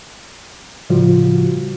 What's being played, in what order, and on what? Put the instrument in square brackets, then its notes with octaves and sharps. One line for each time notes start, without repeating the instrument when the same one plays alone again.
[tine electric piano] A2 C#3 F3 G3 F4 F#4